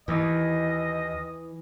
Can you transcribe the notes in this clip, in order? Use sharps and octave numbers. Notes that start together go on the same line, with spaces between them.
D#2 E3 D#5